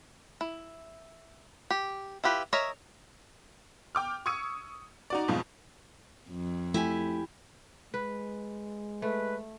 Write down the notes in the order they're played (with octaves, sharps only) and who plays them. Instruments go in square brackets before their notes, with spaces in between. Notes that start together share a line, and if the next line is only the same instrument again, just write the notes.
[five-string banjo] E4
G4
E4 F4 G4 B4
A#4 C#5 D#5 E5
[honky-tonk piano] G5 D6 F6
C#6 D#6 E6 G#6 C#7 D#7
D#4 F#4 D5
F2 B2 F3 G#3
[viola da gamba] F2
[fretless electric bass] A3 [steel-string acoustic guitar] E4 G4 G#5
[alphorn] G#3 [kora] B4
[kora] A3 [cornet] B4